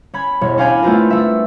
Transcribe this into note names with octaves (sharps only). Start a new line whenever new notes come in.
C#4 B5 G#6
E1 C#5
C#4 D4 F5 G5 G#5 B5
A3 B3 C4 F4 A#4
A3 E5